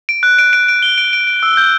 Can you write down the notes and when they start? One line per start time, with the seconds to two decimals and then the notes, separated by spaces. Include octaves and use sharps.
0.09 D7
0.23 F#6
0.39 D7
0.53 D7
0.68 D7
0.83 G7
0.98 D7
1.13 D7
1.27 D7
1.43 E6
1.57 G6